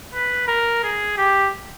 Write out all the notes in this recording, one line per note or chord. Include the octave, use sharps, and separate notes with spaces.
B4
A#4
G#4
G4